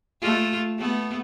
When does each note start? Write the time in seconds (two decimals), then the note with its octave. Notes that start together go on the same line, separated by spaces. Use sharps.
0.21 A3 F4
0.78 A3 B3